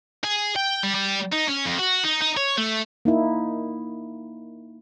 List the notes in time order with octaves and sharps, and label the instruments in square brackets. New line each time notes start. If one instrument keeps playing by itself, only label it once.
[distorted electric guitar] G#4
G5
G3
G3
D#4
C#4
F2
F#4
D#4
D#4
C#5
A3
[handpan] A#3 D#4 E4